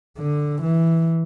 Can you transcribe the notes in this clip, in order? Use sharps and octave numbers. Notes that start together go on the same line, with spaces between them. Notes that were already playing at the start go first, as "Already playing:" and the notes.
D3
E3